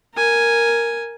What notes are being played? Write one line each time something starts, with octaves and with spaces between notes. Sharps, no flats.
A#4 G#5